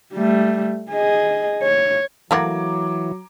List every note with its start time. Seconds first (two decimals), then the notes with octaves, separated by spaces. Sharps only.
0.13 G3 A3
0.91 G#4 D#5
1.63 C#5
2.31 E3 F#3 A3 A#3 F#4 A#5 D6 G#6